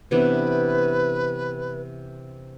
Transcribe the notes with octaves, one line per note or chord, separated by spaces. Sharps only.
C3 E3 B3 D4 B4